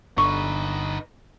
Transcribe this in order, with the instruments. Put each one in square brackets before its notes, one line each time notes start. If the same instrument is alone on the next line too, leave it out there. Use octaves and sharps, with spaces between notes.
[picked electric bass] G1 D3 [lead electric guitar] D#4 B4 [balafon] C#6